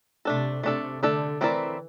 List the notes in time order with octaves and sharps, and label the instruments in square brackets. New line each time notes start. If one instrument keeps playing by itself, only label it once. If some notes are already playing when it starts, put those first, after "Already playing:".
[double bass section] C3 [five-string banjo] A3 D4 A4
[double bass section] C3 [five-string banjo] A3 D4 A4
[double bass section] D3 [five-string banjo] A3 D4 A4
[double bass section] E3 [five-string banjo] A3 C4 E4 A#4 D5